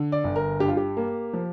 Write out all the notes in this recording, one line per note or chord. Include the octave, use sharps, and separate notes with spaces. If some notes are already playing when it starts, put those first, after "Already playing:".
Already playing: D3
D5
G1
A#4
G2 G4
F4
G4
A#3
F3